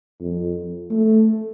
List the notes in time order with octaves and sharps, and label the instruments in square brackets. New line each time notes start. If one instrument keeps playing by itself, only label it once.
[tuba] F2
A3